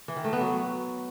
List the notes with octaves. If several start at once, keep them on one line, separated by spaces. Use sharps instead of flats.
E3
D#3
A3
B3
F#3